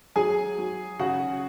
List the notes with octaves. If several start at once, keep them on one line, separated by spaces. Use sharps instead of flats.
F#3 G#4 G#5
F#3
C#3 F#4 F#5